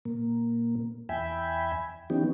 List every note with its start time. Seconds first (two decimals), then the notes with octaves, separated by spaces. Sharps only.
0.05 A#2 A#3
1.09 E2 E5 G5 G#5 B5
2.10 E3 F3 B3 C#4 D#4 G4